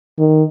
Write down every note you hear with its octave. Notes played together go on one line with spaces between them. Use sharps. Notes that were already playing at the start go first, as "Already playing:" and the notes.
D#3